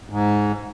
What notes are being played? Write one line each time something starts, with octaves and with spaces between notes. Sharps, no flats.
G#2